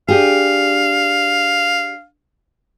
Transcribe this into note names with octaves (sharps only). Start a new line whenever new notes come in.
D4 G4 G#4 F5